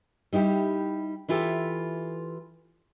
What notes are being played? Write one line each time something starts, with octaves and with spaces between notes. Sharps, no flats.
G3 D#4 E4 G4
E3 E4 F4 G4 A4